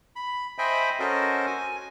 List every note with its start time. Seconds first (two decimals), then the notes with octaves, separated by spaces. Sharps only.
0.16 B5
0.58 C5 D#5 E5 G5 G#5 B5
1.00 C#4 F#4 A4 A#4 C5 D#5
1.47 G#5